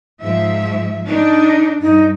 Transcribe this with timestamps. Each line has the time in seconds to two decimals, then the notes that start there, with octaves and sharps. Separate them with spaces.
0.22 G#2 F3 E5
1.07 D4 D#4
1.81 G2 D#4